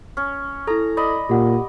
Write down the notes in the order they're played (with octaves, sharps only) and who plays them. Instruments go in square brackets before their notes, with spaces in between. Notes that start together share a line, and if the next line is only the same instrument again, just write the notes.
[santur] C#4
[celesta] E4 A4 [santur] A#5
[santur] D5 D#5 B5
[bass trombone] A#2 [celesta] G4 F#5